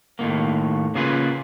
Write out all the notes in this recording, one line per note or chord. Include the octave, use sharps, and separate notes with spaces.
D#2 A2 C#3 A#3
C#3 A#3 F4 G#4 A#4 B4